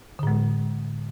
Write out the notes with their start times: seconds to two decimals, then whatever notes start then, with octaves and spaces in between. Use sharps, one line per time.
0.19 D3
0.23 A2
0.27 G#3